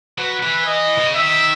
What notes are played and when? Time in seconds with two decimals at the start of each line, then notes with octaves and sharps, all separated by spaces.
0.18 F#3 B4
0.43 E3
0.66 D#5
0.98 B2
1.06 C#3
1.14 D#3 E5